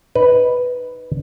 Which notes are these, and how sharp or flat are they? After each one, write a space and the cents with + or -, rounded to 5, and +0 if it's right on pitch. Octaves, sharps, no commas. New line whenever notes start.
D#4 +0 B4 +0